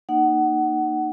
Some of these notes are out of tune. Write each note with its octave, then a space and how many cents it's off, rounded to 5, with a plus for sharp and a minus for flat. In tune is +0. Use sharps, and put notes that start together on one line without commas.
A#3 +0 D#4 -20 F#5 +20